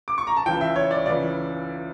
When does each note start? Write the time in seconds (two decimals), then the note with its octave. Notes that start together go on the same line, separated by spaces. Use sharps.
0.08 D6
0.18 C#6
0.27 A#5
0.37 A5
0.46 C#2 C#3 E3 G5
0.61 E5
0.76 C#5
0.91 D5
1.06 C#2 C#3 E3 D5